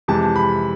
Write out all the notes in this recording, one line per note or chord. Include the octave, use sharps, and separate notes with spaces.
F2 C3 E3 G#3 A5
B5